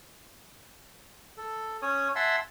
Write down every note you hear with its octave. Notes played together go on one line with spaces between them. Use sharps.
A4
C#4 C#5 D#6
E5 F#5 G#5 A5 C6 E6